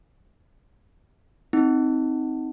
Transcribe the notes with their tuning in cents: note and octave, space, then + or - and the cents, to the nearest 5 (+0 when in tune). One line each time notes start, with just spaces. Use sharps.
C4 +5 D#4 +15